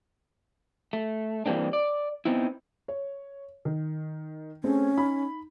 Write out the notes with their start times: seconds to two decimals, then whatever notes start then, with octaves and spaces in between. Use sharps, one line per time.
0.93 A3
1.46 E3 G3 A#3 C4 D4
1.73 D5
2.25 B3 C4 D#4 E4
2.88 C#5
3.65 D#3
4.64 A3 C4 C#4 G#4
4.97 D#4 B5